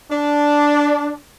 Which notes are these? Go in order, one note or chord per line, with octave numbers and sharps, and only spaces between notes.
D4